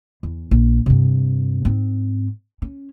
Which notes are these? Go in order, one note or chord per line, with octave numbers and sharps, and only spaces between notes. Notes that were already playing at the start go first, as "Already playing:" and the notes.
E2
A#1
G2 C3
G#2 C4
C#4